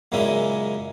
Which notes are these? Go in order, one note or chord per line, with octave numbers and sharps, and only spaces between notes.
F#2 A#2 C#3 G#3 A#3 E4